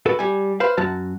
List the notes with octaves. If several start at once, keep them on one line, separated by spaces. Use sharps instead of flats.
F#4 A4 B4
G3 G#5
B4 C5 F5
F#2 F#3 F#4 A5